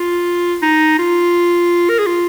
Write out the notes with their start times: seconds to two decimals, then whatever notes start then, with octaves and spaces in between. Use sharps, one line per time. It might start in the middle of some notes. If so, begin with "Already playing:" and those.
Already playing: F4
0.62 D#4
0.99 F4
1.89 A#4
1.99 G#4
2.06 F4